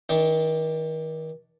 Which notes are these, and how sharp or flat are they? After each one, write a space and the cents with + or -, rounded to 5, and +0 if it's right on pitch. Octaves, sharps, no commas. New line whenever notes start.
D#3 +40 D4 +0